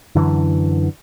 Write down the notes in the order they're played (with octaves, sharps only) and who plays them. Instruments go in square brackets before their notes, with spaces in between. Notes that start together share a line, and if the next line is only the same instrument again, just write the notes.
[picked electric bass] F#2 D3 E3